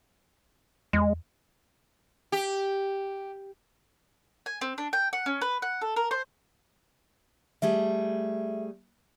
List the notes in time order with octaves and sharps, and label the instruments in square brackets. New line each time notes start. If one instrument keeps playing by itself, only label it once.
[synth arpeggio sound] E2 [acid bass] G#3
[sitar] G4
[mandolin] G#5
C4
D4
G5
F#5
C#4
B4
F#5
A4
A#4
C5
[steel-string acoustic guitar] G3 A3 G#4 [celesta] E5